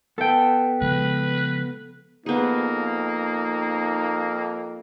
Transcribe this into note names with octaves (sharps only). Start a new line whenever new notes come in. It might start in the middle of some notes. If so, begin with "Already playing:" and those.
B3 A4 G5
C#3 F3 G#3 B4
F2 A#3 B3 D#4 G#4